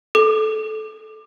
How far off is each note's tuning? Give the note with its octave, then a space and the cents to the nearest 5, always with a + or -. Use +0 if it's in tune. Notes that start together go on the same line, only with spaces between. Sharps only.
A4 -20 D6 +25